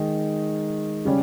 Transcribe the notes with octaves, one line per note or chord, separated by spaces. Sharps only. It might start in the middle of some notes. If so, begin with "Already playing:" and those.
Already playing: D#3 G#3 D#4
C#3 G3 C#4